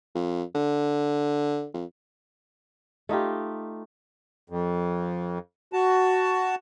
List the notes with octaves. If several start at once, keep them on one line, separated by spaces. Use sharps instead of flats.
F2
D3
F2
A3 D#4 F4 G4
F2
F#4 A5